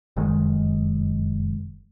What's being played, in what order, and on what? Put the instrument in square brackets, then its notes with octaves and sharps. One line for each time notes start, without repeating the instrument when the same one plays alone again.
[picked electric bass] F1 F#2 D#3 G#3